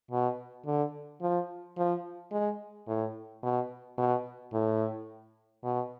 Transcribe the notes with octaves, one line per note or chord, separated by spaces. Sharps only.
B2
D3
F3
F3
G#3
A2
B2
B2
A2
B2